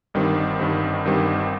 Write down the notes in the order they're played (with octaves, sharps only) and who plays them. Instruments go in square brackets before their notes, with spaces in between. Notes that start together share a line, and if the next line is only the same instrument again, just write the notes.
[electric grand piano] G1 G2 D#3 G3 C4
G1 G2 D#3 G3 C4
G1 G2 D#3 G3 C4